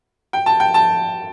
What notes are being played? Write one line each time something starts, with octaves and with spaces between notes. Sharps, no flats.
G5
A5
G5
A5